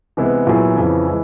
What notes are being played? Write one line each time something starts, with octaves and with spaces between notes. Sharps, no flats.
C3 E3 G#3 B3 E4
A#2 F#3 B3 E4 G#4
F2 C#3 E3
E3 G#3